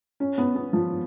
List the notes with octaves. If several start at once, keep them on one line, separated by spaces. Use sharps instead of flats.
C#4
B3
B3
F3